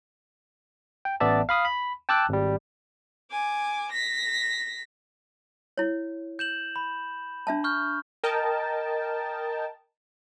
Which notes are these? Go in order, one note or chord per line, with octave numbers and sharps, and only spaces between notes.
G5
A1 B3 D5 E5 A5
F5 B5 D#6
B5
G5 A5 D6 E6 F#6
G#1 G3
G#5 D6
A#6 B6
E4 C#5
G6 E7 F#7
B5
D4 E5 A5
C#6 F6 G6
A#4 D#5 G5 A5